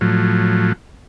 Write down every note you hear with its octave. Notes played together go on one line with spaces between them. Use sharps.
A2 F3 F#3